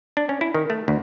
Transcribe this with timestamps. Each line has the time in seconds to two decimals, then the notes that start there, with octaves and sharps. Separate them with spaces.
0.17 D4
0.29 C#4
0.41 E4
0.54 D#3
0.70 A3
0.88 D2